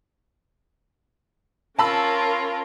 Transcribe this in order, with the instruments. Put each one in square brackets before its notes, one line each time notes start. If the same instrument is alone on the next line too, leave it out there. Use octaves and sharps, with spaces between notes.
[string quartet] C#4 F4 A#4 [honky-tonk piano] A5 B5 E6